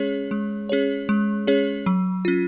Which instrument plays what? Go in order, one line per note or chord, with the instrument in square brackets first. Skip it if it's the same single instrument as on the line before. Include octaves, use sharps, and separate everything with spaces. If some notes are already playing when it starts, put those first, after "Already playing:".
Already playing: [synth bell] G#3 C#4 G#4 C#5
G#3
C#4 G#4 C#5
G#3
C#4 G#4 C#5
F#3
C#4 F4